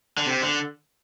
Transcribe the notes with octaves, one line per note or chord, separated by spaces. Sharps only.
D3
C3
D3